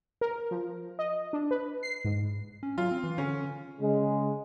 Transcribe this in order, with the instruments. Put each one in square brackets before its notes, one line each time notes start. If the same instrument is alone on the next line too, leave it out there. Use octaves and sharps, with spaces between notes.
[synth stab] A#4
F3
D#5
D4
B4
C7
G#2
[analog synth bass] C#4
[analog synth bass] F#3 [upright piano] F4
[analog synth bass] C4
E3
[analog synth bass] D3 [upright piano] C#4
[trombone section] C#3 G#3